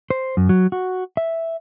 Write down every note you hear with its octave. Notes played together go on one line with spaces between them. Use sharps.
C5
F#2
F#3
F#4
E5